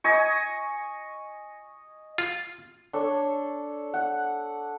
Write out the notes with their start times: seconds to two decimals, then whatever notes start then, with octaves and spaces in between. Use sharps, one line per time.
0.04 D#5 G#5 C#6
2.18 F4
2.93 D4 A4 C#5
3.94 F#5